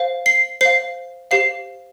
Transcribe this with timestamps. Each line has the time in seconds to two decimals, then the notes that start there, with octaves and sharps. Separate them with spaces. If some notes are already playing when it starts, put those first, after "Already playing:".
Already playing: C5 F5
0.26 C7
0.61 C5 F5 C7
1.31 G4 C5 F5 C7